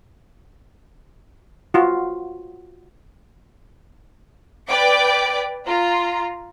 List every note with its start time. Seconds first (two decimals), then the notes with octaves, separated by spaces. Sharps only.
1.74 F4 F#4
4.68 B4 D5 G5 D6
5.67 F4 A#5